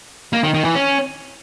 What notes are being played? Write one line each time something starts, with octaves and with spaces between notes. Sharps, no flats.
A#3
D#3
D#3
E3
C#4